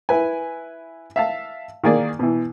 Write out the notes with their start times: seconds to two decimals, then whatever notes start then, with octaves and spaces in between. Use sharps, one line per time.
0.09 E4 B4 G#5
1.16 E5 F5 A5
1.84 D#3 A#3 G#4 D5
2.19 B2 E3